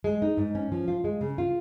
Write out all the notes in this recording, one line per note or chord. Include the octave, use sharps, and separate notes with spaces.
G#3
D#4
G#2
C#4
F3
F4
G#3
C#3
F4